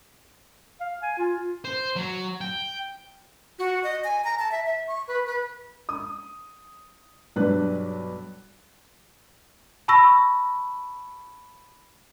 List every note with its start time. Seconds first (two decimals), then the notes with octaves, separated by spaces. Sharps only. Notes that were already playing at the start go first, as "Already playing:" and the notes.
0.81 F5
1.03 G#5
1.18 F4
1.65 C5
1.96 F#3
2.41 G5
3.59 F#4
3.84 D#5
4.04 G#5
4.24 A#5
4.39 A5
4.52 E5
4.66 E5
4.88 C#6
5.08 B4
5.27 B4
5.89 D#6
7.36 B1 G2 D4 B4 F#6
9.88 A5 B5 C#6 E6 A#6